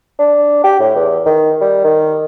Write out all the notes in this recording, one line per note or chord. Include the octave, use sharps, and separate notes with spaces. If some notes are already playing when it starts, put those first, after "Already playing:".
D4
G4
A2
E2
D#3
G3
D#3